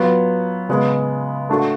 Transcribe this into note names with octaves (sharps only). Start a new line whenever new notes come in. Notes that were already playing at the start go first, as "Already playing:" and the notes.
Already playing: F#3 B3 F4
C#3 G#3 B3
A3 D4 F#4 A4